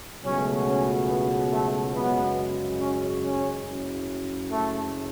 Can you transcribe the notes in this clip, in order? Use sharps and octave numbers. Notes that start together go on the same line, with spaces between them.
C#2 B2 F#3 A3 C#4
C#4
B3
A3
F#2 C#3 G#3 B3
C#4
C#4
F#1 F#2 C#3
A3